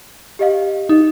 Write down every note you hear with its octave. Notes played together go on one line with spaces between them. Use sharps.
G4 D#5 F5
D#4